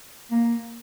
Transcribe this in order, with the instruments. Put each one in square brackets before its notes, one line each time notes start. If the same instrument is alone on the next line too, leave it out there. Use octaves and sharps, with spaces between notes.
[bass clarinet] A#3